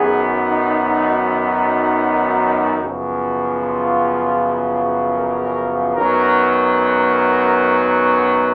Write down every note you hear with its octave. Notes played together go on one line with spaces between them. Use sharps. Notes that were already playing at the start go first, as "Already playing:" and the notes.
Already playing: F#2 D#3 F#3 B3 G#4
D#4
D#4
D#4
F#2 C#3 F3 B3
F4
A#4
F#2 D#3 F#3 B3 A#4
A#4